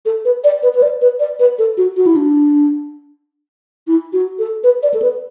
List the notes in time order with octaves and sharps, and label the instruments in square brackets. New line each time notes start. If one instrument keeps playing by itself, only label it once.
[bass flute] A4
B4
D5
B4
B4
D5
B4
D5
B4
A4
F#4
F#4
E4
D4
E4
F#4
A4
B4
D5
A4
B4